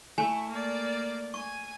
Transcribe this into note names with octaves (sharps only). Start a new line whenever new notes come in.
A3 E4 G#5 C#6
A#3 D5
G#5 C#6